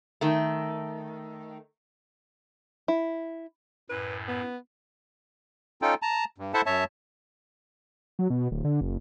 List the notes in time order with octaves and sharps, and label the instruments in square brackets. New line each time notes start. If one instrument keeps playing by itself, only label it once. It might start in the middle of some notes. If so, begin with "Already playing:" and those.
[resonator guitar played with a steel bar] D#3 A3
[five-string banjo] E4
[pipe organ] F#2 A2 [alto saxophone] B4
[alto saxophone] B3
[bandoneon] C#4 D#4 F4 A4 G5
A5 A#5
G2
E4 A4 C5 E5 F#5 A5
F#2 C#5 E5 A5
[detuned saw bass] F#3
B2
D1
D3
F#1